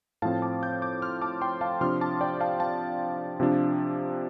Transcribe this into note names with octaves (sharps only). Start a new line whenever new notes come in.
A2 F3 C4 F5 A5
A5 D6
D6 G6
D6 G6
C6 F6
A5 D6
G5 C6
F5 A5
C3 F3 D4 C6 F6
A5 D6
D5 G5
F5 A5
F5 A5
C3 F3 D4